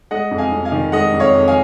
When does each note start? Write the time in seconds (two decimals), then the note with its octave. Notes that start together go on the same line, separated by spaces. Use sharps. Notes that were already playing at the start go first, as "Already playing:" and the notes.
0.11 G#3 D#5 F#5
0.31 F2
0.38 F5 G#5
0.52 F2
0.65 F5 G#5
0.72 D#3
0.92 G#3 D#5 F#5
1.14 F2
1.20 C#5 F5
1.34 F2
1.48 F5 G#5